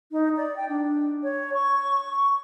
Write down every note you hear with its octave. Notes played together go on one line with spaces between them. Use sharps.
D#4
D5
G5
D4
C#5
C#6